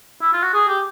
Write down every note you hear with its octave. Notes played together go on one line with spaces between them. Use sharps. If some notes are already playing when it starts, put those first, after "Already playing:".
E4
F4
F#4
G#4
G4